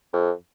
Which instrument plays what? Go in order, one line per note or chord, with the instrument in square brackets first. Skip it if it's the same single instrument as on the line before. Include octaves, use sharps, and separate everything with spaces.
[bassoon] F2